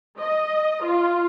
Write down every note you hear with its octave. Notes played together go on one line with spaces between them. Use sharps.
D#5
F4